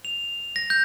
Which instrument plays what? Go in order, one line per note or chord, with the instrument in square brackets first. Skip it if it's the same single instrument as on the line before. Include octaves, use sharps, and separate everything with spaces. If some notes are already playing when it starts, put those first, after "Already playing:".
[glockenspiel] F7
A#6
G6